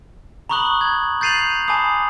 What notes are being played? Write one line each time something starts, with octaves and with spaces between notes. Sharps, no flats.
A#5 B5 C#6 D#6 F#6 F#7
G#6
G6 A6 C7 D#7 F7 F#7
G#5 A5 B5 D6 D#6 C7